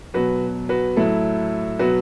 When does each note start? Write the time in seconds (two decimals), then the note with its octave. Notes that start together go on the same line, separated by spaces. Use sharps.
0.14 B2 F#3 F#4 B4
0.69 F#4 B4
0.96 A2 F#3 E4 A4
1.79 B2 F#3 F#4 B4